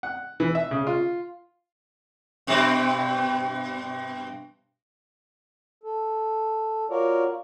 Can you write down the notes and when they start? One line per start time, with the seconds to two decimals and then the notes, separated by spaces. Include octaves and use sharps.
0.03 F#5
0.40 E3
0.55 E5
0.71 C#3
0.87 F4
2.47 G2 B2 C4
5.84 A4
6.90 F4 F#4 A#4 C#5 D5